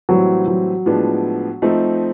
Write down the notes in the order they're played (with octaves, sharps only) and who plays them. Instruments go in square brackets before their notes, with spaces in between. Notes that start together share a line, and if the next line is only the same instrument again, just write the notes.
[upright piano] A2 E3 G3 C4 [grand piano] F#3
[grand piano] F#3
[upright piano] A2 F3 G#3 B3 D4
F3 A3 C4 D#4